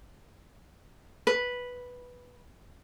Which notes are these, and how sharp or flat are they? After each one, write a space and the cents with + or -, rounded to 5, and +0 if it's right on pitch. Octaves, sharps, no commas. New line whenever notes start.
B4 -5